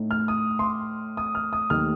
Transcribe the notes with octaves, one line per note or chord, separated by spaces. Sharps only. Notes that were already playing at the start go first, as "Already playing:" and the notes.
Already playing: A2 A3 D#4
F6
D#6
C6
D6
D#6
F6
D#6
D#2 D#3 A3 F6